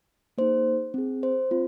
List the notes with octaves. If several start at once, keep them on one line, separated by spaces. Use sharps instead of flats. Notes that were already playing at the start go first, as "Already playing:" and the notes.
A#3 D#4 G#4 C5
C4 G#4
C5
C4 F4